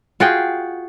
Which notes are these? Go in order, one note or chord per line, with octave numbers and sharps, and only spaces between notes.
F4 F#4 G#4 G5